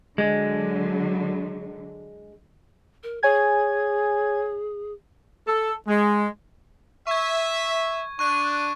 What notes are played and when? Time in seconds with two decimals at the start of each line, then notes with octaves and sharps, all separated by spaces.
0.18 D3 F#3 G#3
3.03 A#4
3.23 G#4 C#5 G#5 G#6
5.47 A4
5.88 G#3
7.07 E5 C#6 G#6
8.19 D4 C#6 F#6 D#7